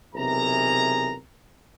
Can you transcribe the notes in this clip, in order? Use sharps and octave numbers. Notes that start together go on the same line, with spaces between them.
B1 C3 E3 G#4 A#4 A#5